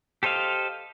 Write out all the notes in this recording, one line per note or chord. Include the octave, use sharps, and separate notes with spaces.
G4 A4 C5 D#5 F5